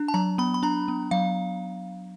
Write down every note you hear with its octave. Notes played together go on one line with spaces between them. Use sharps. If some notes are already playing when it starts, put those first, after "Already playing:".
Already playing: D4
A5
F#3 A#5
B3 B5
B5
D4 A#5
B3
F#3 F5